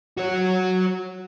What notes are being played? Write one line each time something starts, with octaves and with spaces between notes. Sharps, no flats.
F#4 C#5